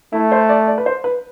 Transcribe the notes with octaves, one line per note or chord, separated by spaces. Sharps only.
A3 E4
C5
D5
D5
B4
C5
B4